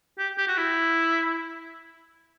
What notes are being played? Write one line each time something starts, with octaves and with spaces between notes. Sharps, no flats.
G4
G4
F#4
E4